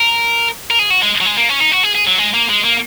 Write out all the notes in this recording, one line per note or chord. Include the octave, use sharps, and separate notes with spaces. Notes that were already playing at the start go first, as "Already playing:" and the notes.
Already playing: A#4
A#4
G#4
F#4
G#3
F#3
G#3
A#3
C#4
D#4
F#4
G#4
G#4
F#3
G#3
A#3
G#3
A#3